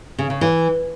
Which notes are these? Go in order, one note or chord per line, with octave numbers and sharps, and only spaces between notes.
C#3
C#3
E3